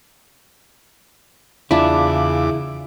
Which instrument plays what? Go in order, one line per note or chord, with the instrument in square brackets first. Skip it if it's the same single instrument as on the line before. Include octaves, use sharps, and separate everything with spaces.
[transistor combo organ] E2 D6 [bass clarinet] C#3 [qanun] D4 F4 E5 [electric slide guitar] E4